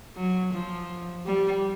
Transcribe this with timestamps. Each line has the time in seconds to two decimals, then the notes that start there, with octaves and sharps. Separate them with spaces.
0.16 F#3
0.53 F3
1.26 G3